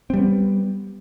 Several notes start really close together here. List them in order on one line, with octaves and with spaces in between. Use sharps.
C4 G3 B3